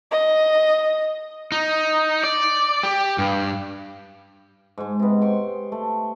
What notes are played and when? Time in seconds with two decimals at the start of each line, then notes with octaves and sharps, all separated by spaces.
0.11 D#5
1.52 D#4
2.24 D5
2.83 G4
3.18 G2
4.78 G#2 G#3
5.00 C3 B3
5.21 F#5 G5 C6 C#6
5.72 A3